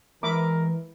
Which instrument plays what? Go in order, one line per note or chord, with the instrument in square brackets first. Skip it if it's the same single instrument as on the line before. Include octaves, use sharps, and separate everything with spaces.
[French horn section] E3 [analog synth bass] G#3 [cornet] A#4 [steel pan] E5 B5 D6